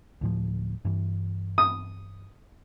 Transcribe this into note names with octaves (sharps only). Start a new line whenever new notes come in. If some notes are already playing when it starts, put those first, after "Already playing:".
D2 A2 F3
G2 E3
D#6